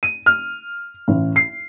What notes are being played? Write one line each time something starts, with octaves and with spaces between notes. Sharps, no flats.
D#7
F6
A1
C7